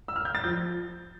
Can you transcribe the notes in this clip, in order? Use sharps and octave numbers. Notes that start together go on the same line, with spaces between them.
E6
F6
G6
A6
F3 G6